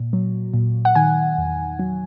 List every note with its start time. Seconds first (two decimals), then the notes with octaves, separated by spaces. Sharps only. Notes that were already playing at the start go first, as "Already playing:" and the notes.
Already playing: A#2
0.13 F#3
0.54 A#2
0.85 F#5
0.95 D#3 G#5
1.38 E2
1.79 F#3